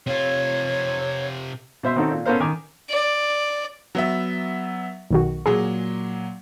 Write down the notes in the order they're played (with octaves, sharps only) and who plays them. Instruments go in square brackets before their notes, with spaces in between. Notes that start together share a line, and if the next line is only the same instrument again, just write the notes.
[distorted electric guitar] C3 F4 [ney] C#5
[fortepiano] B2 C5 E5 C6
D#3 C4 C#4 D#4 F#4 A4
A#2
B3 C#4 A4 A#4 C5 F5
D#3 G#5 D6
[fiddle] D5
[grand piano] F#3 B3 E5
[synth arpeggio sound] B1 D#3 F#4
[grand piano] A#2 F#3 [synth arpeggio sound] G#4